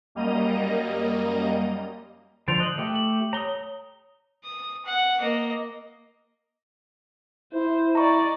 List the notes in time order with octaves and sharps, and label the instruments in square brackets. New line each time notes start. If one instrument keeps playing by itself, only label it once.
[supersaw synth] F#2 G3 A#3 D#5 A#5 D#7
[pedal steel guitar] D3 F3 C5 [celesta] A6 D7 F7
[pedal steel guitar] D#5 [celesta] F#6 F#7
[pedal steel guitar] A3 G4
[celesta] F#7
[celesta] C#5 G7 [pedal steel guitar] A#5 D#6
[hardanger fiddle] D#6
F#5
A#3 D#5
[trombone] E4 [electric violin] C5
[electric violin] D5 D#5 [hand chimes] A#5 C#6